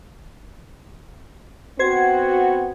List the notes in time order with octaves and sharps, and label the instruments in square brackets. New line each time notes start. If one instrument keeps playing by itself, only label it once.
[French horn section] B3 C4 F#4 [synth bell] C5 G#6